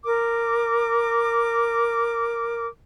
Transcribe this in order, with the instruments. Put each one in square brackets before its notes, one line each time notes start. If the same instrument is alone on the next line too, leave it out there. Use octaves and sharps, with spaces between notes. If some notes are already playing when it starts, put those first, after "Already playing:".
[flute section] A#4 D6